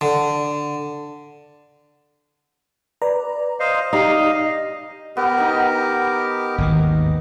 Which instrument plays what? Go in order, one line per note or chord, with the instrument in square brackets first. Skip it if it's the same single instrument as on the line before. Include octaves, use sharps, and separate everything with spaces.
[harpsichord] D3
[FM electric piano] B4 D5 A#5
[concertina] C5 D#5 F5
[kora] D#4 [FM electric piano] G4 D5 [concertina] D#5 F5
[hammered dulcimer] B3 [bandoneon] G4 A#4
[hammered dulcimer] D#4 D#5
[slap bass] G#1 D#2 D#3